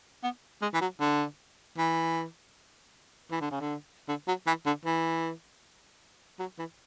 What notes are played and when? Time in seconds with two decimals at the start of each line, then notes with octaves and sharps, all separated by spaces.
0.23 B3
0.62 G#3
0.74 E3
0.81 F#3
1.00 D3
1.78 E3
3.31 E3
3.41 D3
3.51 C#3
3.61 D3
4.09 D3
4.28 F#3
4.47 E3
4.66 D3
4.85 E3
6.39 F#3
6.59 E3